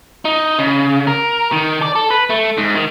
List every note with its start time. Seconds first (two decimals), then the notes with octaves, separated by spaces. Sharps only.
0.25 D#4
0.59 C#3
1.07 A#4
1.52 D#3
1.82 D5
1.95 A4
2.10 B4
2.30 A3
2.58 G#2
2.75 D#3